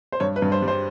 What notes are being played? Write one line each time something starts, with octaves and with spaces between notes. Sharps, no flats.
C5
G2 C#5
B4
G2
C5
G3
C5